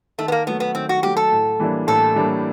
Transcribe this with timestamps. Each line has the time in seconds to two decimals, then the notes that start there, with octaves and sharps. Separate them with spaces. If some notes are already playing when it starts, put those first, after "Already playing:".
0.18 D#3 A3
0.28 B3
0.32 A#3
0.46 F#3 A3 B3
0.60 B3
0.74 D#3 C4
0.89 F#4
1.03 F#3 A3 G4
1.17 A4
1.32 A2
1.60 E3 G3 A#3 D4
1.87 A2 A4
2.15 E3 G3 A#3 D4